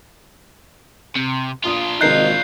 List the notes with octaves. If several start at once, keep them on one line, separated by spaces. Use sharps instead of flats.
C3
A#2 D4 F4 D#6
G#1 C3 D#4 A#4 D#5 F#6 G6 C7